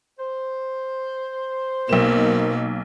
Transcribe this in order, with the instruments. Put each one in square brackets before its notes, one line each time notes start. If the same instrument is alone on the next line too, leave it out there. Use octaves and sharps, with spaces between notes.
[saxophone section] C5
[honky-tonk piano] B1 E7 [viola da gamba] B2 A#3 D#4 [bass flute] A#4